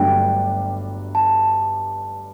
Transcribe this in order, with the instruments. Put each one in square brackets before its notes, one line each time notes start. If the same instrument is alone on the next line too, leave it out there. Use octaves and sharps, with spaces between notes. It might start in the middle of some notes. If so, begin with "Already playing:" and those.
Already playing: [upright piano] G1 G2 F#3 A3 D4 [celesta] G5
[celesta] A5